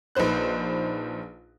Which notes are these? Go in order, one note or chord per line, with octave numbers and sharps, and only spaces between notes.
A#1 D#4 B4 C5 F#6